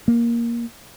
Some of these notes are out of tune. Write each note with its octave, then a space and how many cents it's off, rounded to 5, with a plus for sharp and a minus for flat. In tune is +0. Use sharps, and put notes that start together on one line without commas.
A#3 +10